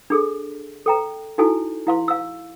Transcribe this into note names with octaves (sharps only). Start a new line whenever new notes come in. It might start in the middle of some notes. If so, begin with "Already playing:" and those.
D4 G#4 A4
A4 G5 A#5
D#4 E4 F#4 A4 G#5
E4 F5 C6
F5 E6